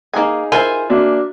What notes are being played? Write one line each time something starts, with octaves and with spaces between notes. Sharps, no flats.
A#3 D#4 G#4 G#5
E4 F4 A#4 C5 G#5
A#3 D4 F#4 E5